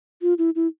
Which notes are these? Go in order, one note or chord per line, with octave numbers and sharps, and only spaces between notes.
F4
E4
E4